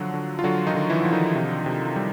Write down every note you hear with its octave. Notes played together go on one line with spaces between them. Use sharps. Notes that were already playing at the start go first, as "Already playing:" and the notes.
Already playing: D3 F3 F#3 F#4
D3
F4
D3 F#3 F#4
D#3 D#4
D3
E3 E4
F3
D#3 D#4
C3
C3
G3